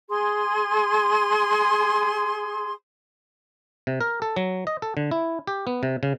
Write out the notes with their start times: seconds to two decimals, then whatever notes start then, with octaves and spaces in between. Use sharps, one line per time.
0.09 G#4 C6
3.87 C3
4.01 A#4
4.22 A4
4.36 F#3
4.67 D#5
4.82 A4
4.97 D3
5.11 E4
5.47 G4
5.67 B3
5.83 C3
6.03 C#3